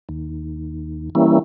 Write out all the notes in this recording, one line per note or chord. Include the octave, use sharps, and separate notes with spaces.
D#2
E3 G3 A#3 C#4 E4